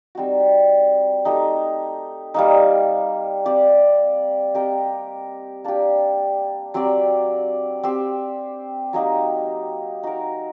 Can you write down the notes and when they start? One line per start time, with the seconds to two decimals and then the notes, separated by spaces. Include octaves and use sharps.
0.15 G3 C4 D#4 F#4
1.25 A3 D#4 G4
2.34 G3 A#3 D#4
3.45 C4 G4 D5
4.55 C4 G4 A#4 D#5
5.64 A#3 D4 G4
6.74 F#3 C4 G4 D5
7.83 C4 G4 C5
8.93 F#3 A#3 D#4 G4
10.03 D#4 F#4 A#4